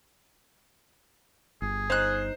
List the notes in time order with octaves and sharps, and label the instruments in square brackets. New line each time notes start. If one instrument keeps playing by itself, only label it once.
[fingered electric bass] G1 [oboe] G#4
[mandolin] D#4 F#6 [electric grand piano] C5